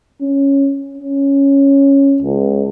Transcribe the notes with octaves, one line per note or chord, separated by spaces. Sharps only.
C#4
C#4
C#2